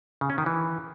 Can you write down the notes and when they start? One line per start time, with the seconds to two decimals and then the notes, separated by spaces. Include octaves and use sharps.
0.21 C#3
0.30 C#4
0.38 D#3
0.46 E3